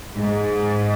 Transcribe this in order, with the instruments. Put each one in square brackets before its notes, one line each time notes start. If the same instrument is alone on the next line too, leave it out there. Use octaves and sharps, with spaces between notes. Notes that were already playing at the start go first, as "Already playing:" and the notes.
[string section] G#2